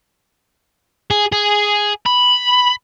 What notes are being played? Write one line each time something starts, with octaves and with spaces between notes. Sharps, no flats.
G#4
G#4
B5